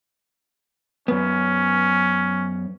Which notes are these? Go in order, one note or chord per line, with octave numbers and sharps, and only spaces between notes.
F#2 B3 C#4